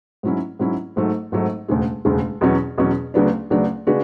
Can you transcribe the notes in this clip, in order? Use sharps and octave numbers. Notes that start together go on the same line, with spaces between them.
G#2 F#3 C#4 E4
G#2 F#3 C#4 E4
G#1 G#2 F#3 A3
G#1 G#2 F#3 A3
E1 D2 C#3 G#3
E1 D2 C#3 G#3
E2 B2 F#3 C#4
E2 B2 F#3 C#4
D2 C#3 F#3 B3 D4
D2 C#3 F#3 B3 D4
C#3 G#3 D4 F#4 B4